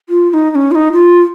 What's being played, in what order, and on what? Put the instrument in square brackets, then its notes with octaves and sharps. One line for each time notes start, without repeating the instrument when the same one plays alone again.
[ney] F4
F4
D#4
D#4
C#4
F4
D#4
F4